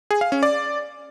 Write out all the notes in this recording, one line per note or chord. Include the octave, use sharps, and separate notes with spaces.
G#4
F5
C#4
D5